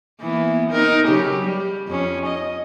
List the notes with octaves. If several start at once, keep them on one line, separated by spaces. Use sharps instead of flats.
E3 A#3 B3
C4 D#4 A#4
C#3 F#3 G4
G3
F2 C#4
D#5